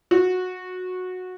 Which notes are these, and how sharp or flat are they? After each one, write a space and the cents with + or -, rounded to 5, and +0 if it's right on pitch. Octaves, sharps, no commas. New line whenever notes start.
F#4 -15